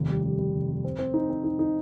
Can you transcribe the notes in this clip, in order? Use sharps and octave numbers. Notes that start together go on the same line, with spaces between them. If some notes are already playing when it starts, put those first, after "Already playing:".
Already playing: F1 D#2
G3
G3
G3
F1
G3
C4
C4
D#4
C4
D#4
D#4